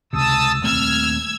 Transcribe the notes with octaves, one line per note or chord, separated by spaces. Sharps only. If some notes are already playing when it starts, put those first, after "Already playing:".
C#2 C3 A5 D#6 E6
D#1 A3 C4 E6 F6 G#6